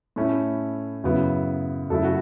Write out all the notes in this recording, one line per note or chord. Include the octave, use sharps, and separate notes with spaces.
A2 A3 C#4 E4
F#2 C#3 F#3 B3 E4
F#2 C#3 F#3 A3 E4 A4
F#4